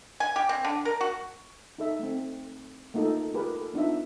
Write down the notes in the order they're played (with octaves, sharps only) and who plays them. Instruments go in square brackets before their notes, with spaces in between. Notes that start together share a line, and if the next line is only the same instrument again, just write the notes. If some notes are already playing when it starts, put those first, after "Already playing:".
[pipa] G#5
G4
C4
D3
A#4
F#4
[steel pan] D#4 A4 E5
A3 C4
A3 A#3 D#4 F4 A4
F4 G4 G#4 A#4 B4
A4
B3 D4 D#4 F4 E5